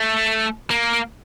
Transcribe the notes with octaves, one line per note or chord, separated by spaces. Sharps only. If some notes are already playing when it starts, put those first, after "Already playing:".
Already playing: A3
A#3